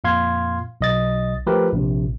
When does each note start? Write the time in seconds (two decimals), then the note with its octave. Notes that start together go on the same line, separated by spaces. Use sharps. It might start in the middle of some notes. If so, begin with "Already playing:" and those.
0.04 F2 A#2 F5 C6 G#6
0.81 B1 D#5 A6
1.47 F3 A3 G4 A#4 B4
1.73 A#1 C3